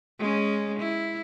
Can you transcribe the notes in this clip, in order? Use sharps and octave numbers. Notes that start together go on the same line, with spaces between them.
G#3 C#4
E4